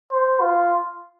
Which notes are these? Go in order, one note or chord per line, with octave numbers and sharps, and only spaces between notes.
C5
F4